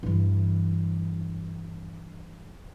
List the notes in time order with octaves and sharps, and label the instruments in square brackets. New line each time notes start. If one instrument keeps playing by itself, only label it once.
[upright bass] G2 E3